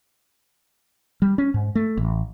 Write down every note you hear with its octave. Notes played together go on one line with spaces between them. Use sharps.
G3
C#4
G#2
A3
A1